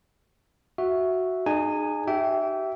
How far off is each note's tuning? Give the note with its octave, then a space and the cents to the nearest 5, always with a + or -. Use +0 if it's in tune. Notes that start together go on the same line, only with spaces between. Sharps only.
F#4 +0 E5 +0
D#4 -35 G#4 +0 G#5 +0
G4 -40 E5 +0 G5 -20